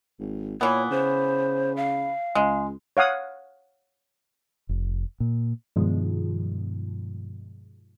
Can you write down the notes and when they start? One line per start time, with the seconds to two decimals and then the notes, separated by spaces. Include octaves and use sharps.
0.20 G#1
0.61 A#2 E3 B3 C#5
0.91 C#3 C5
1.77 F5
2.35 C#2 G#3
2.97 C#5 F5 F#5 D#6
4.69 F1
5.20 A#2
5.76 G2 B2 D#3 F3 G#3